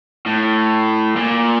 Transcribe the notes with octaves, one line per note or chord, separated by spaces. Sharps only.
A2
A#2